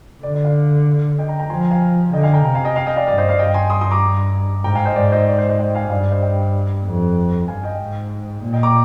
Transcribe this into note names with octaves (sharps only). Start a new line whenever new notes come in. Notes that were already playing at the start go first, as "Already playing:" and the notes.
D3 D5
D5
D5 F5
D#5 G5
G5 A#5
G5 A#5
F3 G#5 C6
G5 A#5
F5 G#5
D3 D#5 G5
F5 G#5
G5 A#5
C3 G5 A#5
F5 G#5
D#5 G5
F5 G#5
D#5 G5
D5 F5
G2 D5 F5
C5 D#5
D5 F5
G2 D#5 G5
G#5 C6
C6 D#6
C6 D#6
A#5 D6
G#2 G5 A#5
F5 G#5
C5 D#5
G#2 D5
C5 D#5
D5
C5
C5 D#5
D#5 G5
F5 G#5
G2 D5 F5
D5
C5 D#5
D#5 G5
F2
G2 F5 G#5
D#5 G5
G#2
A#2
D#5 G5
A#5 D6